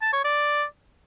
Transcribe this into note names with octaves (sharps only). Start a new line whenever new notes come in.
A5
C#5
D5